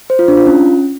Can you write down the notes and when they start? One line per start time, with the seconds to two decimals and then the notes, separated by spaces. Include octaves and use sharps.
0.10 C5
0.19 F4
0.28 D4
0.37 F4
0.46 C#4